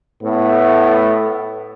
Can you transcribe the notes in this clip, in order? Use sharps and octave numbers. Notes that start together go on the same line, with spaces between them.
A2 A3 B3